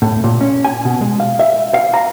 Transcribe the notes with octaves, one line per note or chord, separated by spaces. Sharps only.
A2
A#2
C#4
G#5
B2
G#3
F5
E5
F5
A#5